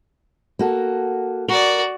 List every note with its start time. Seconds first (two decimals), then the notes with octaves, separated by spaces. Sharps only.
0.59 A#3 F#4 A4
1.48 F#4 A#4 D5